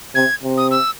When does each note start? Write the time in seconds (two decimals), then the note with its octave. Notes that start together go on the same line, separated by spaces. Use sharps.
0.15 C3 G#6
0.43 C3
0.57 D#6
0.71 E6